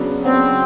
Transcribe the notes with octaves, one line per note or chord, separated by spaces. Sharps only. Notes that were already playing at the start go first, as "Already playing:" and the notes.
Already playing: C#3 F#3 B3 D4
C#3 F#3 B3 C4 D4